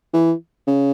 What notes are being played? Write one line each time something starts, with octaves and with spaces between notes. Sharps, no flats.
E3
C#3